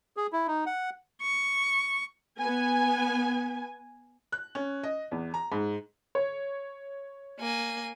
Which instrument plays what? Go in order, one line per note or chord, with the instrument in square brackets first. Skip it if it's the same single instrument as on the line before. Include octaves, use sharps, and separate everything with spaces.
[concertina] G#4
E4
D#4
F#5
[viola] C#6
[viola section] B3 G#5
[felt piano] F#6
C#4
D#5
E2
A#5
G#2
[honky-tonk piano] C#5
[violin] A#3 G#5